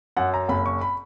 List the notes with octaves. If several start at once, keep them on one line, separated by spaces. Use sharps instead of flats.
F#2 F#5
A#5
F#1 B5
C#6
B5